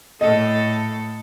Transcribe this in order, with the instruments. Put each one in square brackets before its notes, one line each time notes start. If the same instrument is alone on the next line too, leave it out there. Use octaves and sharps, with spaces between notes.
[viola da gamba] A2 A4 [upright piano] D#5